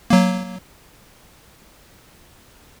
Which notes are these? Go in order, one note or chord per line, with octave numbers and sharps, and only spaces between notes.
F#3 A#3